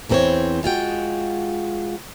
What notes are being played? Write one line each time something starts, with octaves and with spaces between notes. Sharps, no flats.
E2 E3 C4 A4 C5 C#5
G#3 F4 F#4 G5